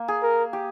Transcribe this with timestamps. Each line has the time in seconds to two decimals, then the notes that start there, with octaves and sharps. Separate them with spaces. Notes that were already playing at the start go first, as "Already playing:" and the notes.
Already playing: A#3
0.08 G#4
0.23 A#4
0.53 G4